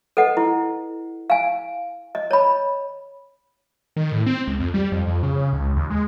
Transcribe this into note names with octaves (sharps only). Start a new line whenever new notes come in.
A4 B4 D#5 F#5
E4
F5 G#5
D#5
C#5 B5
D#3
A2
C4
C#2
F2
G3
F2
F2
C#3
C#2
D#2
G#3